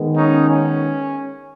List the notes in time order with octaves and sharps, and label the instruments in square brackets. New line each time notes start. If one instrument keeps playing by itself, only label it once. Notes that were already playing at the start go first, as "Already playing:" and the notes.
Already playing: [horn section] D#3 G#3 B3
C#4 D#4
C#4